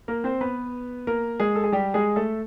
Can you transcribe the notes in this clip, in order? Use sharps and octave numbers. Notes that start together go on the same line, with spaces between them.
A#3 A#4
C4 C5
B3 B4
A#3 A#4
G#3 G#4
A4
G#4
G3 G4
G#3 G#4
A3 A4